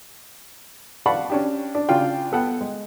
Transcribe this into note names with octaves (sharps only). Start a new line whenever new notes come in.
D5 F5 F#5 A5 B5 C#6
C#4 D4 G4
D4
C#3 D4 F4 D5 F5 G5
B3 A4 B4 F#5 G5
G#3